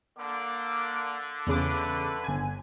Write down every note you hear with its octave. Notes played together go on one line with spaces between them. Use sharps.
D3 A#3 D6
E2 C#3 A3 B4 D6
G1 G#5